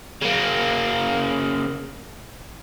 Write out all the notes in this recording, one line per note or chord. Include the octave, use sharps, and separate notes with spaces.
C#3 A#3